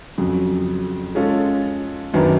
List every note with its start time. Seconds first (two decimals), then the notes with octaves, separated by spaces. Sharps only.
0.18 F2 C#3 F#3
1.15 G#3 C#4 F4 A4
2.14 F#2 D#3 F#3 B3 D4